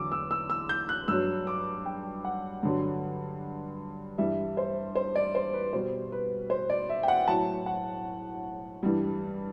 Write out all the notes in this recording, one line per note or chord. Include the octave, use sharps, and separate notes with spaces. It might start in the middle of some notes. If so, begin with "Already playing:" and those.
Already playing: E2 D3 F#3 D6 E6
E6
E6
E6
G6
F#6
G2 F#3 E6
D6
G5
F#5
G2 D3 F#3
G2 E3 G3 E5
C5
C5
D5
C5
B4
B2 G3 C5
B4
C5
D5
E5
G5
F#5
A2 F#3 A5
F#5
G2 E3 G3